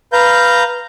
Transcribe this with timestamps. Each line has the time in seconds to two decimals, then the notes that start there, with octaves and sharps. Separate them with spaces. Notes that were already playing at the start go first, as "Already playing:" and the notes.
0.13 B4 F5 A#5 G6